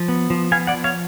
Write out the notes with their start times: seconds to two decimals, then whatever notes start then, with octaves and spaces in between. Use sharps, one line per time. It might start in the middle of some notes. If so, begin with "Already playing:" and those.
Already playing: F3
0.08 B3
0.30 F3
0.52 B3 F5 G#5
0.67 D5 F#5
0.74 F3
0.84 C#5 F5